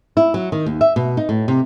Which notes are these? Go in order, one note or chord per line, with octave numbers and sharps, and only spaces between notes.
E4
F#3
D#3
D#2
E5
B2
D#4
A2
C3